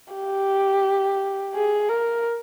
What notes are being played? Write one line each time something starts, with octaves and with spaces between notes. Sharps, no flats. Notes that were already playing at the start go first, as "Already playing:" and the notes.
G4
G#4
A#4